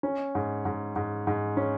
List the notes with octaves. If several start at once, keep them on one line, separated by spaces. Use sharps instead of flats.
C#4
G#2
G#2
G#2
G#2
C#4